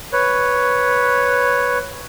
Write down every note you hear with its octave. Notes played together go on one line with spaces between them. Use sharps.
B4 C#5